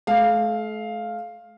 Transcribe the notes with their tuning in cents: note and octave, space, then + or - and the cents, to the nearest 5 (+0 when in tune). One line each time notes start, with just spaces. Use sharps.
A3 -40 F5 +0